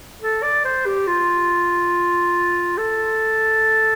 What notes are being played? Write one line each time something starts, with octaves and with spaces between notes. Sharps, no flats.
A4
D5
C5
G4
F4
A4